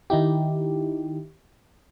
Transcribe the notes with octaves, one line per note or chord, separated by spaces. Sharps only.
D#3 D#4 E4 G4